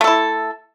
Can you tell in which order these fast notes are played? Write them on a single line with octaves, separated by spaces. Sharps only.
A3 A4 E4